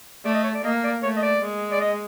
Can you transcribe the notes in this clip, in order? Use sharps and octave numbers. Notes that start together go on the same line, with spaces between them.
A3 D5
D#5
C#5
D5
A#3 D#5
D5
A3 C#5
D#5
D5
G#3
D5
D#5